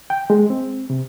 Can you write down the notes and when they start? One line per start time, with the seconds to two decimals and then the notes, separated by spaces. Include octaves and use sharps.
0.10 G5
0.30 G#3
0.50 C4
0.90 C3